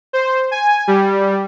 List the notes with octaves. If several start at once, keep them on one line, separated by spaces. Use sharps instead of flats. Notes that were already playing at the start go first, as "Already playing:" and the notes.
C5
G#5
G3